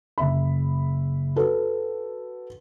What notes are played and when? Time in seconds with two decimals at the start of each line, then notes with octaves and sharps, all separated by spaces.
0.18 F#1 E5 B5
1.36 F#4 A4 B4